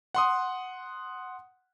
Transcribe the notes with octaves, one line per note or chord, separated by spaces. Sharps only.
F#5 C6 D#6